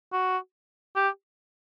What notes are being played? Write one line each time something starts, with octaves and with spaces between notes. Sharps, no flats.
F#4
G4